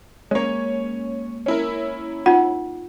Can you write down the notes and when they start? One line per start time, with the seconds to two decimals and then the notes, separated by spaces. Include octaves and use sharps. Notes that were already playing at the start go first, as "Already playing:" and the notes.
0.31 G#3 A#3 C#4 C#5
1.46 C#4 E4 A#4
2.26 D#4 F4 F#5